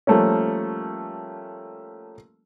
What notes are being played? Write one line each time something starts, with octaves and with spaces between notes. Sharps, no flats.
F3 G3 A3 A#3 C#4